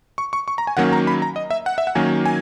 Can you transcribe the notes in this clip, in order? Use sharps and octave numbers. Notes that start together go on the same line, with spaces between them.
C#6
C#6
C#6
A#5
G#5
D#3 F#3 A#3 C#4 F#5
A#5
B5
A#5
D#5
E5
F#5
E5
F#5
D#3 F#3 A#3 C#4 G#5
G#5